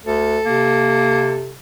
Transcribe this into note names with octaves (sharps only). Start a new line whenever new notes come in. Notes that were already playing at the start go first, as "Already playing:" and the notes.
D2 A4
C3 A#3